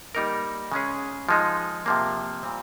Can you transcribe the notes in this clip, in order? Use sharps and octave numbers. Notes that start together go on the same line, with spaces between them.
G3 A#3 D#4 A#4
C#3 G#3 C#4 G#4
F3 G#3 D#4
C3 F3 A#3
A#2 G3 C4